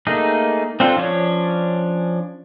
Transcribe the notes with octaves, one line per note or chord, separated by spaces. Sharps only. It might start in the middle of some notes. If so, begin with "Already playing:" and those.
A3 A#3 D#4 G#4
C4 D4 F4 A4
F3 C#4 D4 C#5